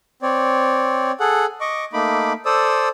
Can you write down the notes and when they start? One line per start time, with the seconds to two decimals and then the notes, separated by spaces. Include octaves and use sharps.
0.22 C4 C#5 D5
1.20 G#4 A4 F#5
1.61 D#5 C#6 D6
1.93 A3 A#3 D#4 B5 D6
2.45 A4 C5 D5 D#6 E6